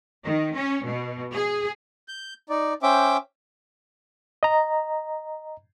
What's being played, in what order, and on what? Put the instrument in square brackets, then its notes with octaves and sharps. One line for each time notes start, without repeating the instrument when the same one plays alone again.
[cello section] D#3
C#4
B2
G#4
[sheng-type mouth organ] G6
D#4 D5
C#4 C5 E5 G5 D6
[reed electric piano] D#5 A#5